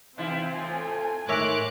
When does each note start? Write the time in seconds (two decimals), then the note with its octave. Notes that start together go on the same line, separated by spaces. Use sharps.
0.18 C3 E3 C4 E4 F4
0.54 A2 F4 G#5
1.29 A2 D#3 G#3 A#4 C#5 E5 D6 F#6